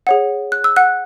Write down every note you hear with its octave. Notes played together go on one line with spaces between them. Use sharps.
G#4 C#5 F#5
F#6
E6
F#5 F#6